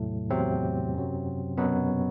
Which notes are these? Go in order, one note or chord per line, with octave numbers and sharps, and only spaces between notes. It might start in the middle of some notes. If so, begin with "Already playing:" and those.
Already playing: E2 A2 C3 F#3 A3
E2 C3 F#3 C4
F#2 F#3
F#2 B2 F#3 B3